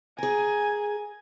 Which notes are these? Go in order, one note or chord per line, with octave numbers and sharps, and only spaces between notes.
G#4 A#4 G#5